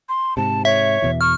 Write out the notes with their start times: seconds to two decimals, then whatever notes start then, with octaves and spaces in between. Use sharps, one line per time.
0.09 C6
0.37 G#2 C3 A5
0.65 C#5 E5
1.02 E2 B2 E3
1.21 C#6 F6